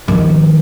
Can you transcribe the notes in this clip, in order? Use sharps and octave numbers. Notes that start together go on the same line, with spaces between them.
G#1 G#2 D#3 F3 G#3